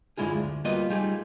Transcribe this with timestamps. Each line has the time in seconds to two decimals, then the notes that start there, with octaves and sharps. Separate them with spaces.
0.17 F#2 D3 G#3 E4 F4 G#4
0.33 D2
0.64 G3 A#3 B3 F4 F#4 D#5
0.90 G3 A3 D#4 F4 G4 G#4